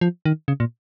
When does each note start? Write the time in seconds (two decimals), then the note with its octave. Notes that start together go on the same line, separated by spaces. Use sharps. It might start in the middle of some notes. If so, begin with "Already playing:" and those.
0.01 F3
0.25 D#3
0.48 C#3
0.60 A#2